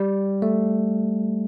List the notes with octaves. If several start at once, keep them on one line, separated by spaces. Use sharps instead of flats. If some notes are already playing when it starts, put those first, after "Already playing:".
Already playing: G3
A3